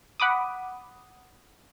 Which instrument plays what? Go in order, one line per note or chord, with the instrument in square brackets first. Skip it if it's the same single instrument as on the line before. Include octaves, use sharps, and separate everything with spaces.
[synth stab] F#5 B5 D6 D#6